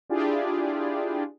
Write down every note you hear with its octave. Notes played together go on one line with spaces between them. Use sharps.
D4 E4 F4 G4 G#4 D5